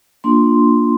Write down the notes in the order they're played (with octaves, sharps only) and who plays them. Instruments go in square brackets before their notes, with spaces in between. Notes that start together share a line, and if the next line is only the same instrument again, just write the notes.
[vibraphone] A#3 D4 F4 C6